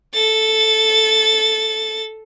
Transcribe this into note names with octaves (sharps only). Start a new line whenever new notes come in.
A4 A6